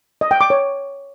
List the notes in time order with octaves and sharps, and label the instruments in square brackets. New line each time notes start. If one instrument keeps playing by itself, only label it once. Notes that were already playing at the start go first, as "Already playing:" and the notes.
[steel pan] D#5
G5
D6
C#5